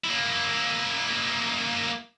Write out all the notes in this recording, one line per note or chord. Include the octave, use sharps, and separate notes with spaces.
A#3 E4